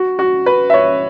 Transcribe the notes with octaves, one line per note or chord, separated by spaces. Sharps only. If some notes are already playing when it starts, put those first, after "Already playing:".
Already playing: F#4
F#4
B4
E5
C#5